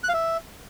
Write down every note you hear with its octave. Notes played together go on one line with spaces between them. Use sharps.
F#6
F5
E5